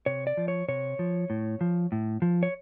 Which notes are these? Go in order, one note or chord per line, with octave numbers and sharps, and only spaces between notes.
C3 C#5
D5
F3
C#5
C3 C#5
F3
A2
F3
A2
F3
C#5